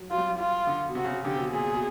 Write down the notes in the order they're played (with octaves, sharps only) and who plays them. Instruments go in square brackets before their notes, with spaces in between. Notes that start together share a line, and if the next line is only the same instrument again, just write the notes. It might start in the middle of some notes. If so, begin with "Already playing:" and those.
Already playing: [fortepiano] F#3
[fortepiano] F#3 [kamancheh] F4
[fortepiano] G3
F#3
[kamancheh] F4
[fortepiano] D3
B2
[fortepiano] C3 [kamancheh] F#4
[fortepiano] C#3
C3
[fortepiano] D3 [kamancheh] G4
[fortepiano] C3
B2
[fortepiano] A#2 [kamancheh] G#4
[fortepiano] B2